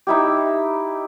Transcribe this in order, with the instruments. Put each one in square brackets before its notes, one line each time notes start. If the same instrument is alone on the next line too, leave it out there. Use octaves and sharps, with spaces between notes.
[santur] D#4 E4 G4